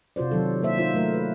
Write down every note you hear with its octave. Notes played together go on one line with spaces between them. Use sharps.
C3 F4 F#4 C5 D5
D#3 F#3 A4
C3 A#3 C5 E5
D#4 F4 C5
F#3 A3 A#4
B4